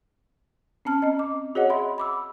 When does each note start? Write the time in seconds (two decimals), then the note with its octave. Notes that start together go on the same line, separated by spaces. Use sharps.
0.85 C4 C#4 A5 F6
1.02 C4 D#5
1.19 D6
1.55 F#4 G#4 C#5 D#5 F#5
1.70 E5 B5 C6
1.98 B5 D6 E6